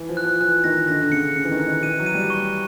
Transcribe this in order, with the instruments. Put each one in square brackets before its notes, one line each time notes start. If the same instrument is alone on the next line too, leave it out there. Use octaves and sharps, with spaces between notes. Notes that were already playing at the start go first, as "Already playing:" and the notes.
Already playing: [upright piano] E3
F3
[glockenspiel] F#6
[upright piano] F3
[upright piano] E3 [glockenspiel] F#6
[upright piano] D#3 [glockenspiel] A#6
[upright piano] D3 [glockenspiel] A#6
[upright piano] D3
[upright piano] C#3 [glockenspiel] C#7
[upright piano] D3 [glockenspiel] C#7
[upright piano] E3
D#3
[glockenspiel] F#6
[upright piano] D#3
[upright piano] E3 [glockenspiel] D#7
[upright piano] F#3
[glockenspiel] D#7
[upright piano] G3
[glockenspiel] C#6